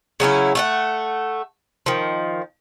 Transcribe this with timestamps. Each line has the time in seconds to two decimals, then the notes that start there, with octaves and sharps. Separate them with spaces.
0.20 C#3 F#3 C#4 E4
0.55 A3 F5 F#5
1.86 D#3 F3